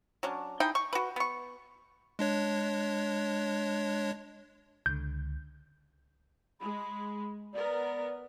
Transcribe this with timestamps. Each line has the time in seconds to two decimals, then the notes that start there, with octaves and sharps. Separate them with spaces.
0.23 F#3 C#4 D4
0.60 D#4 E4 G#4 G5
0.75 C#6
0.93 F#4 B4
1.16 B3 C#6
2.19 G#3 D4 C#5
4.86 C#2 D3 G6
6.61 G#3 B5
7.54 B3 A#4 D5